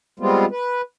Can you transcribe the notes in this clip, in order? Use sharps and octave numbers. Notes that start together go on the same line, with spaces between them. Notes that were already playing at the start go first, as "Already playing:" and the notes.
G3 G#3 B3 C4 F4
B4